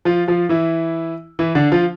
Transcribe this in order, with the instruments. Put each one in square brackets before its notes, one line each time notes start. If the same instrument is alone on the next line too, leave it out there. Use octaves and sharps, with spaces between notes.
[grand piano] F3 F4
F3 F4
E3 E4
E3 E4
D3 D4
F3 F4